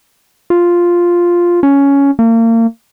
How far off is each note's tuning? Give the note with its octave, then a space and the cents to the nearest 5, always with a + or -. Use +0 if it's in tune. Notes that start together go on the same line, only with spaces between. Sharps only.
F4 +0
C#4 +10
A#3 -35